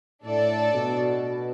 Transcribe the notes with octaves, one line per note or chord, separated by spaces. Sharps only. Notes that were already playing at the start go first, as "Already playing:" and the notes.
A2 D4 A4 D5
B2